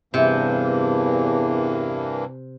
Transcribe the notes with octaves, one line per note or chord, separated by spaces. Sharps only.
E2 G2 C3 E3 A#3